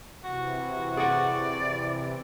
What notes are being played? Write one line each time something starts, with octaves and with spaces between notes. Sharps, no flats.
C3 E3 F#4
G#4 D5 F#5